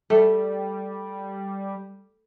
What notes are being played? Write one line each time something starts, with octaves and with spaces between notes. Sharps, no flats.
G3 A3